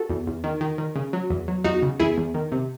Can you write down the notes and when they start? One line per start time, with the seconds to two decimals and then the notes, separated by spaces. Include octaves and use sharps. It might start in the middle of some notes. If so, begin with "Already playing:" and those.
Already playing: F#4 A4
0.09 E2
0.27 E2
0.44 D#3
0.61 D#3
0.78 D#3
0.96 C#3
1.13 F#3
1.30 E2
1.48 F#3
1.64 E2 D#4 F#4
1.83 C#3
2.00 E2 E4 G#4
2.17 E2
2.34 D#3
2.52 C3